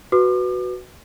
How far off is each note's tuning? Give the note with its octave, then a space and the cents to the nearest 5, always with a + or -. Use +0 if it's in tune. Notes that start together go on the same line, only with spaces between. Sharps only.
F#4 +0 B4 +0 D6 +40